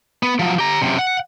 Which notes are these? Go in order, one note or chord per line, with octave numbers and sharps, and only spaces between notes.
B3
F3 F#3
G4 A#5
F#2 C3
F#5